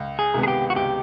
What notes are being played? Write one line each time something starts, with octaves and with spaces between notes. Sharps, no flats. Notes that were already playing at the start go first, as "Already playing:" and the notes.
Already playing: C#2
G#4
C3 D#3 G#3 B3
G#4
G4
F#4
C#2 G4